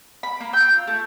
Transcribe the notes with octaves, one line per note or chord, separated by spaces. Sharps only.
B5
A#3
G5 E6 G6
F4
A3